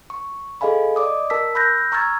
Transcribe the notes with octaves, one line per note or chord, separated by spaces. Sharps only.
C#6
G#4 A4 D#5 F5 G#5 B5
D5 D#5 D6 D#6
A#4 A5 E6 B6
B5 E6 F#6 G6 A#6
A#5 C#6 E6 F6 G#6 A6